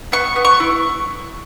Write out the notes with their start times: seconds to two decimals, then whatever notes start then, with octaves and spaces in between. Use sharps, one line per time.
0.12 B3 C#6
0.36 B3
0.45 C#6
0.60 E4